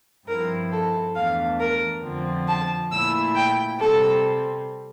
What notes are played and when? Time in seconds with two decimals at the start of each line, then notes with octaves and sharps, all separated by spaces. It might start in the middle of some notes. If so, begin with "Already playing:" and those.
0.28 G2 F3 C4 E4 A#4
0.72 A4
1.15 E2 E3 A3 D4 F5
1.60 A#4
2.04 F2 D3 F3 C4
2.48 A5
2.92 A#2 A3 E4 E6
3.35 G5
3.80 C3 G3 C4 A4